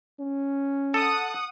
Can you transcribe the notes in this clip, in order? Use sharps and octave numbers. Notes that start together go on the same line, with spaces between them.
C#4
A4 F#5 D#6